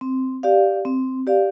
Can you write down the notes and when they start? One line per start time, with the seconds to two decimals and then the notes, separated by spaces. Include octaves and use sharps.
0.01 C4
0.43 G4 D5 F5
0.85 C4
1.27 G4 D5 F5